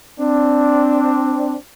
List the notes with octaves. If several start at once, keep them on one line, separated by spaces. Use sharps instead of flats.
C4 D4